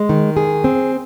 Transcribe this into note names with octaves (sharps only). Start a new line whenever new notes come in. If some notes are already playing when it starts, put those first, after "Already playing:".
Already playing: G#3
D#3
G#4
C4